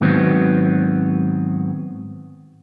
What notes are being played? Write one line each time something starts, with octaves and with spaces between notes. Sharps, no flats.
G#2 D#3 F#3 B3 C4